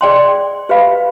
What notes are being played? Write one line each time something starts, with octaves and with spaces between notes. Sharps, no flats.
G#4 D5 G5 C6
G4 B4 F5 B5